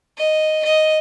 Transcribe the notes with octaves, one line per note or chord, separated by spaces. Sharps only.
D#5
D#5